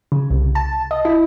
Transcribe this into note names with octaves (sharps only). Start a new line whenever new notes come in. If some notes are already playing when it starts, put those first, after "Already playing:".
C#3
C2
A5
D#5
E4